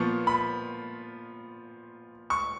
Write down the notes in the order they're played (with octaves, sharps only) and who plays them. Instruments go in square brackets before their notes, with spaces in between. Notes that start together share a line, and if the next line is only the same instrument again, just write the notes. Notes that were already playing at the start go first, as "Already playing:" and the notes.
Already playing: [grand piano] A#2 F3 B3 C#6
B5
C#6